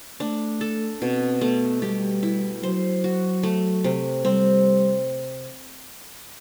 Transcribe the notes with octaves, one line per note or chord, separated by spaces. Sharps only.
A3 D4
A4
B2 C4
A3 B3
G3 G4
E4
F#3 C5
F#4
A3
C3
G3 C4